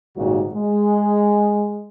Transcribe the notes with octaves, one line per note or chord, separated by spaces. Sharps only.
G#1 A#2 C#3 G3 D#4 F#4
G#3